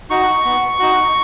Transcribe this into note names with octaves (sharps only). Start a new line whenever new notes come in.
D#4 F#4 C#6
B3
D#4 F#4